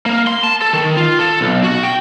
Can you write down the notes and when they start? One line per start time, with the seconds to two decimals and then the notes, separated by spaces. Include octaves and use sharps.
0.06 A#3
0.27 C6
0.44 A5
0.62 A4
0.73 D#3
0.97 F4
1.19 A4
1.41 B1
1.64 F#4
1.83 G5